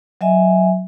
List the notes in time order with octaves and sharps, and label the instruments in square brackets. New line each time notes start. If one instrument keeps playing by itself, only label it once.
[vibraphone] F#3 D#5 E5 G#5